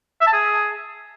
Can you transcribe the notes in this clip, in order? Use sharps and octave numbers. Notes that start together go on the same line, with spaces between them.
E5
A5
G#4